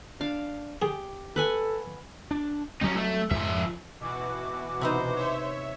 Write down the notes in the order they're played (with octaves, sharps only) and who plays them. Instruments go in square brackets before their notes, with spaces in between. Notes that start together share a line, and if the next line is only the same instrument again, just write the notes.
[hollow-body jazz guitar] D4 [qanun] F5
[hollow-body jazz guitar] G4 [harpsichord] G#4
[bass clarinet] A4 [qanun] B4 F#5 G#5
[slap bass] D4
[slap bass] F#3 G3 C4 [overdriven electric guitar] C#4 D#4
[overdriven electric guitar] A3
[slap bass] F2 G#2 [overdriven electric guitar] F3 E5
[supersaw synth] B2 E3 F#4 [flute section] D6
[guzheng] C3 B3 D#4 [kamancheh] C5
[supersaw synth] C#5 E5